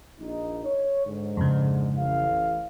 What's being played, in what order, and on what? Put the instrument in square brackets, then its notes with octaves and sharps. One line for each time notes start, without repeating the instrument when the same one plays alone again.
[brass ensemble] A#1 D#4
C#5
G#2 D3
[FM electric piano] F2 C#3
[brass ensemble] A1 F5